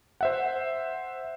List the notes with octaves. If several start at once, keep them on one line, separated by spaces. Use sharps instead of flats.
C5 E5 F#5